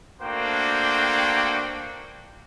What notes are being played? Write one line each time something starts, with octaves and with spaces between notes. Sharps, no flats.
A3 A#3 D4 F#4 C5 G5